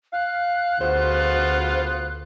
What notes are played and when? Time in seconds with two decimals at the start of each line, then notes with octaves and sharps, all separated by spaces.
0.13 F5 F#6
0.81 D2 B3 F4 F#4 G#4 C5